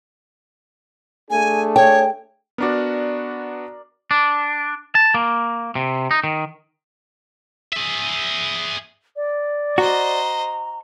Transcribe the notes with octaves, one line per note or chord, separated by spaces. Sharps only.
A3 D4 G#4 G#5
C#5 G5
B3 D4 F#4 A#4 D5
D4
A5
A#3
C3
D#4
D#3
G#4 E5
D5
F#4 C5 D#5 A#5